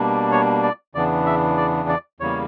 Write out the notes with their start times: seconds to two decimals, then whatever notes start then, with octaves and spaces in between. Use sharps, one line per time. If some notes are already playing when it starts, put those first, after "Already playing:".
Already playing: B2 G3 A#3 D4
0.32 C#5
0.63 D5
0.95 E2 C#3 E3 B3 D4 D5
1.26 E5
1.57 D5
1.89 D5
2.20 E2 C#3 G3 A#3 C#5